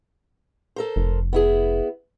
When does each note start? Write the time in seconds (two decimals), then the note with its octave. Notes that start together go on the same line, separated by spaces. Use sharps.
0.76 A4 A#4 C5
0.96 F1
1.33 B3 E4 G#4